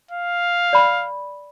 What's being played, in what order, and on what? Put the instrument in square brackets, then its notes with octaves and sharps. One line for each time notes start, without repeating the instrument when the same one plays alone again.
[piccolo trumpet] F5
[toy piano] D5 B5